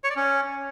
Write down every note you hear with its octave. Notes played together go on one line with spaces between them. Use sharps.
C#5
D5
C#4